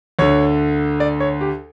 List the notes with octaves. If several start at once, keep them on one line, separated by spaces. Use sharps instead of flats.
D2 D3 C#5
D5
C#5
G4